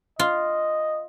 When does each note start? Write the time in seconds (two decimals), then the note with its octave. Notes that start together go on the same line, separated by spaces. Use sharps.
0.19 F4 D#5